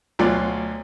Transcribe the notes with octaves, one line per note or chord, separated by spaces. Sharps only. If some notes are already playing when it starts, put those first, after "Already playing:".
D2 B2 F#3 F4 D5